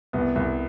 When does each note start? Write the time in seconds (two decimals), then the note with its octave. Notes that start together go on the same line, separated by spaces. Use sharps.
0.13 C2 B3
0.35 C2